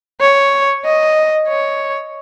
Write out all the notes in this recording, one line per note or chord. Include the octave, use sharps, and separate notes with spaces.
C#5
D#5
C#5